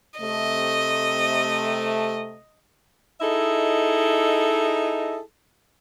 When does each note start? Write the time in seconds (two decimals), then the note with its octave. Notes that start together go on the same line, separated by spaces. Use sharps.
0.20 C3 A3 D#5
3.21 D#4 E4 G#4 A4 D#5 E5